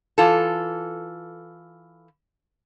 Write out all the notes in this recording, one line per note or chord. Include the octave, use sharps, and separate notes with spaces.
E3 F4 A4